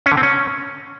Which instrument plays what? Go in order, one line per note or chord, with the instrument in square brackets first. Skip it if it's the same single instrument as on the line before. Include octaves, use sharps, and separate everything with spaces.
[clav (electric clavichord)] C#4
D3
C4
C#4